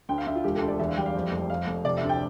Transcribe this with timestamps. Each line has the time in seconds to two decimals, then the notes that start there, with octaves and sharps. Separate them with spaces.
0.09 D2 G5
0.18 F5
0.27 D2 E5
0.35 F4
0.44 E1 G4
0.56 A4
0.62 D2
0.68 D5
0.79 E2 E5
0.88 F5
0.97 G3 G5
1.06 F5
1.15 F2
1.32 F1
1.50 F2 F5
1.67 F1
1.85 C3 D5
1.97 E5
2.03 D2
2.09 G5